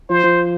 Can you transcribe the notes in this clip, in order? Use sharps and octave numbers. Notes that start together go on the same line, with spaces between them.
F3 C5
F3